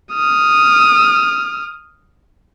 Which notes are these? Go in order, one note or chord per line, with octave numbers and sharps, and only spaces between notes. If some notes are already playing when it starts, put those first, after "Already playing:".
D#6 F6